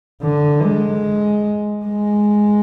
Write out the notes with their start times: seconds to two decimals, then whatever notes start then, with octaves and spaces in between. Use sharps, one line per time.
0.23 D3
0.63 G#3
1.85 G#3